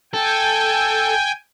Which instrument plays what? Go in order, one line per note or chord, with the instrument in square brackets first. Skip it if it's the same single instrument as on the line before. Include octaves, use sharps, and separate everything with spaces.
[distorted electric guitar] A4 [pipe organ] G5 G#5